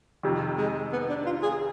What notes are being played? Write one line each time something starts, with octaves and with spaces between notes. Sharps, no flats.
F2 C3 D#3
G#3
B3
D4
F4
G#4